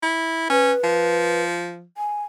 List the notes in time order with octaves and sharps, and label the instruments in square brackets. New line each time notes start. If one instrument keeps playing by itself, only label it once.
[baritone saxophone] E4
[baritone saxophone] C#4 [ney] B4
[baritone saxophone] F3
[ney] G#5